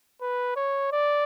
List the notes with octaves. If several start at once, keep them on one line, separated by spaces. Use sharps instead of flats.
B4
C#5
D5